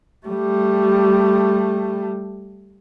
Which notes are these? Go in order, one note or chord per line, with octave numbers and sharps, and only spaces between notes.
G3 A3